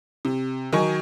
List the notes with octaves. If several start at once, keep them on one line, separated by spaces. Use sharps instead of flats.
C3
D#3 F#3 G#5 C#6